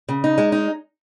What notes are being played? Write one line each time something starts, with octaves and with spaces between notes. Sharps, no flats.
C#3
D#4
G#3
D#4